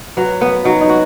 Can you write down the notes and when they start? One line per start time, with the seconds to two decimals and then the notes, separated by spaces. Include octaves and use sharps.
0.17 F#3 B4
0.41 B3 B4
0.64 F#3 D#4
0.81 D#4
0.89 F#4